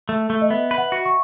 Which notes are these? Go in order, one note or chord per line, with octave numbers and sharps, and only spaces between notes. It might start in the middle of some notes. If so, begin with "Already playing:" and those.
A3
A3
D#5
B3 E5
B4
F#5
F#4
C#6